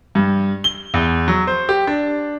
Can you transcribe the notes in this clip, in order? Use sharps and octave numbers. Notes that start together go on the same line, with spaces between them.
G2
G7
E2
F#3
C5
G4
D4